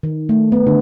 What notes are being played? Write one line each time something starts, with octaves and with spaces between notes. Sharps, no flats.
D#3
A3
B3
D3